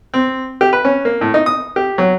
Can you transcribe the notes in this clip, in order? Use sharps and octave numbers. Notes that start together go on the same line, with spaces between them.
C4
G4
B4
C#4
A#3
A2
D#4
D#6
G4
F#3